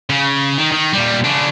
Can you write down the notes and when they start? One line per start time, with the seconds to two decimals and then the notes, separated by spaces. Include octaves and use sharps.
0.10 C#3
0.58 D#3
0.72 D#3
0.93 A#2 G3
1.24 C#3 D4